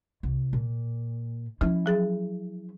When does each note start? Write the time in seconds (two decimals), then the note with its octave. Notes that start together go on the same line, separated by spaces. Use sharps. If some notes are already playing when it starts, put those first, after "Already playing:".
0.23 C2
0.53 A#2
1.61 F3 C#4 E4
1.86 F#3 G#4 A6